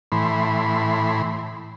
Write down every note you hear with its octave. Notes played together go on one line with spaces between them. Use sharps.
A2 E3 B5 C6